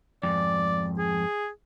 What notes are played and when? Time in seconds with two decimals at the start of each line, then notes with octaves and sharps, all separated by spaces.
0.23 F2 G#2 D5
0.98 G#4